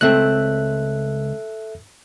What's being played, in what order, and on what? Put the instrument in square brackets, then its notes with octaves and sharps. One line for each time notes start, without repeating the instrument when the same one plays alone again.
[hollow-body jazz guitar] C#2 A3 C4 [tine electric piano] A4 E5 F#6